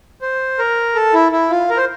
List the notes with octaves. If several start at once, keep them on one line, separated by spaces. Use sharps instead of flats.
C5
A#4
A4
E4
E4
F4
A#4
C5